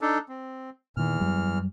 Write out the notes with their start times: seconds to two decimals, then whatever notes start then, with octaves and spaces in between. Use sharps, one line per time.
0.01 D4 D#4 A4
0.29 C4
0.97 E2 A#2 D#3 E3 F6
1.20 F#2 F#3 G3